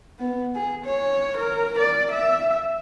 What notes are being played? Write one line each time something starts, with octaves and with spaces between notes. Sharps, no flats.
B3
G#4
C#5
A#4
D5
E5